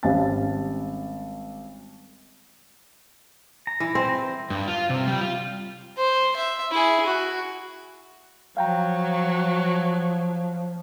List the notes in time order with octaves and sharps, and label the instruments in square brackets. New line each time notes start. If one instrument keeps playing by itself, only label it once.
[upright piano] G#1 G3 C#4 F5 A5 A6
[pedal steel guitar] A#5
[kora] E3
E3 C4 C5
[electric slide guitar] G2
F4
C3
G3
F4
[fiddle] C5
E5
E4 G#4
F#4
[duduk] F3 [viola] F#3 [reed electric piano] F5 G5 A#5